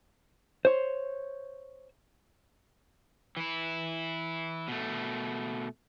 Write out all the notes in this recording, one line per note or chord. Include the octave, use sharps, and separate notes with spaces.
C5 C#5
E3 E4
B2 A3